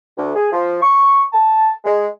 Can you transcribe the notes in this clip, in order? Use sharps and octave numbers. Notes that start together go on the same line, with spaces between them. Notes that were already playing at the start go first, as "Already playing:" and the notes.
D2
G#4
F3
C#6
A5
G#3